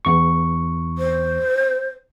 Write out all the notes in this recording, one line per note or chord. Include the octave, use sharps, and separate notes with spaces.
E2 C#6
C5